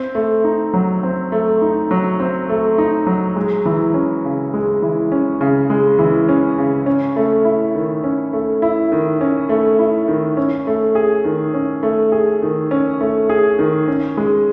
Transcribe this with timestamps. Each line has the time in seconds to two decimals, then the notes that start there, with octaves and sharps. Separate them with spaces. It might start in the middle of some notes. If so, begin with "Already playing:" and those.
Already playing: C4
0.15 A3
0.44 D#4
0.74 F#3
1.03 C4
1.32 A3
1.62 D#4
1.91 F#3
2.20 C4
2.49 A3
2.78 D#4
3.07 F#3
3.36 G#3
3.65 E3
3.94 C#4
4.24 C#3
4.54 G#3
4.82 E3
5.12 C#4
5.41 C#3
5.70 G#3
5.99 E3
6.29 C#4
6.58 C#3
6.86 C#4
7.16 A3
7.45 E4
7.75 D#3
8.04 C#4
8.33 A3
8.62 E4
8.92 D#3
9.21 C#4
9.49 A3
9.79 E4
10.08 D#3
10.37 C#4
10.67 A3
10.95 G#4
11.24 D#3
11.54 C#4
11.83 A3
12.12 G#4
12.42 D#3
12.71 C#4
13.01 A3
13.29 G#4
13.59 D#3
13.88 C#4
14.17 G#3